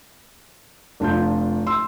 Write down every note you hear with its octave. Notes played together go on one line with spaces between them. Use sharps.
F1 D4 F4 G6
C6 E6